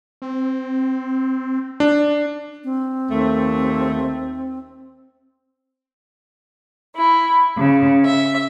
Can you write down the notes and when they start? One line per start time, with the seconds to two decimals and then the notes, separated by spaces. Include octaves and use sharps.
0.22 C4
1.80 D4
2.64 C4
3.11 D#2 A3
6.96 E4
7.56 C#3
8.05 E5